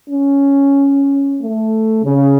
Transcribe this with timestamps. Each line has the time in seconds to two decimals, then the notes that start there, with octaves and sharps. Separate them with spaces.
0.10 C#4
1.40 A3
2.04 C#3